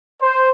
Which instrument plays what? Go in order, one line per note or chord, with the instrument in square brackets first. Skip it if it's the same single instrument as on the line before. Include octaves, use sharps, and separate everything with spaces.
[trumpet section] C5